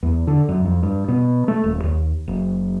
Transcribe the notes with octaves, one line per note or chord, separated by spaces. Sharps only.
E2
D3
F#2
F2
G2
B2
A3
D#1
D#2
F#1